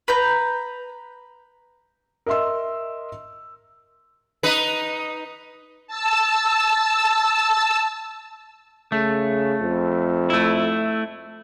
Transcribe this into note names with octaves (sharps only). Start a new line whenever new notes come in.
B4 A#5 G6
A#4 D#5 E5 C6 E6
D#4 B4
A5 E6
C#3 A3
F2
A3 E4